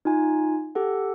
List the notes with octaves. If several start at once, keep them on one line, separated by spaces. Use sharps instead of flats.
D#4 F4 G#5
G4 A4 F#5